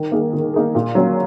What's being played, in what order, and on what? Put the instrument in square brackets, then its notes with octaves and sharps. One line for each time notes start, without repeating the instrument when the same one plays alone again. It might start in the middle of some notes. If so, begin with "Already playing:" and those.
Already playing: [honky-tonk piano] D#3
A#3 D#4 G#4
D#3
A#3 D#4 G#4
A#2
F#3 A#3 C#4